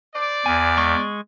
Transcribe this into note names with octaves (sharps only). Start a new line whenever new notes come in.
C5 D5
E2 G#5
G#3 C#6